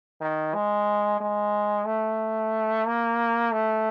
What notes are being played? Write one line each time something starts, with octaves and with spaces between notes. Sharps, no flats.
D#3
G#3
G#3
A3
A#3
A3